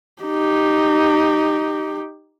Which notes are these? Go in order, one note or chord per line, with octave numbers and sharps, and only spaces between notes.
D#4 G4